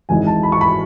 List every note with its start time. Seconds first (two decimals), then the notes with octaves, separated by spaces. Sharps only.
0.09 G#1 G#2 E3 G#5
0.27 A5
0.43 B5
0.52 C#6
0.61 B5